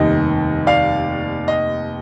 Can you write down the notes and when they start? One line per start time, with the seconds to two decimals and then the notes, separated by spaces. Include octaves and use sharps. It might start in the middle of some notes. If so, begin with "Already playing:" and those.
Already playing: F1 D#2 D#3 G3 D#5
0.67 D5 F5
1.48 D#5